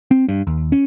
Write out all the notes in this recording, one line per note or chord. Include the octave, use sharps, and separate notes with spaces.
C4
G2
D#2
C#4